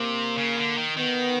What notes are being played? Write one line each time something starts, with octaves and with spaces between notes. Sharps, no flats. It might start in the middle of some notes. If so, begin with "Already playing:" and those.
Already playing: C3 A#3
C#3
D3
D#3
D#3 B3